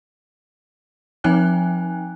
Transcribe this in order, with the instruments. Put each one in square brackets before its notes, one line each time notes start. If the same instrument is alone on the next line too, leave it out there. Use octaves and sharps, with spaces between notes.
[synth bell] F3 C4 D#4 G5 G#5 F#6